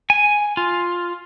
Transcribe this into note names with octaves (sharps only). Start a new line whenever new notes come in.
G#5
F4